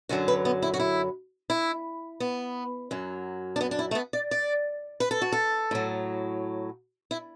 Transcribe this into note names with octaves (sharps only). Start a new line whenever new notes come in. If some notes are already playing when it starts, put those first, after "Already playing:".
F#2 D3 F#3 F#4
B4
B3
E4
F#4
E4
E4
B3
F#2 F#3
D4
B3
D4
E4
A3
B3
D5
D5
B4
A4
F#4
A4
A2 F#3
E4